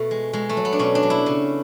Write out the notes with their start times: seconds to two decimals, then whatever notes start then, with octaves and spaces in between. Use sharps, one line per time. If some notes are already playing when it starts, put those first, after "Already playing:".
Already playing: B2 A3
0.11 G#3
0.33 B2 G#3
0.49 A3
0.57 F#3
0.65 B3
0.73 D4
0.79 B2 C#4
0.95 D4
1.03 F#3
1.10 E4
1.26 C#3